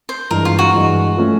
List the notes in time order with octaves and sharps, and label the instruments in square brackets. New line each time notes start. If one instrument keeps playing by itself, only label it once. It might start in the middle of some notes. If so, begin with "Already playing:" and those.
[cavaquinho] C5
[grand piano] G2 E3 G#3 [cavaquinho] A#4
[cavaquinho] F4
F#4
[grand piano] G2 E3 G#3
F3 A3 C#4